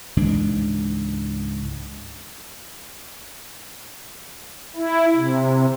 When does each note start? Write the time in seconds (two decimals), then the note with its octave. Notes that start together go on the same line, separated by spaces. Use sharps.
0.17 C#2 G#2 E3 D4
4.76 E4
5.15 C3